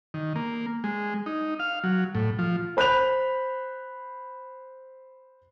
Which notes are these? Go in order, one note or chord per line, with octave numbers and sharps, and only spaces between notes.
D#3
A#3
G#3
D#4
F5
F#3
A2
F3
C5 B5 F#6 G6 F7